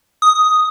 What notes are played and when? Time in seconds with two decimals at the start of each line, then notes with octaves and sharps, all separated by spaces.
0.22 D#6